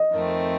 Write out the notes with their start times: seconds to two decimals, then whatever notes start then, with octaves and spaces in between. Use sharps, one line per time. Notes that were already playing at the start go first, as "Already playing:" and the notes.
Already playing: D#5
0.11 F2 D#3 A3 C4